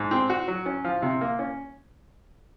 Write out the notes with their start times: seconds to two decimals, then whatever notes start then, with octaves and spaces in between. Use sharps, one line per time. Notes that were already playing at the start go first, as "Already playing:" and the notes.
Already playing: G#2
0.11 C4
0.29 F#4
0.48 F#3
0.66 C#4
0.84 F3
1.02 C3
1.21 A#3
1.39 C#4